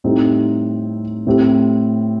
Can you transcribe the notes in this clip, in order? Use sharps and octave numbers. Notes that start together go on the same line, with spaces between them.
A2 G3 C4 D#4
A2 A3 C4 G4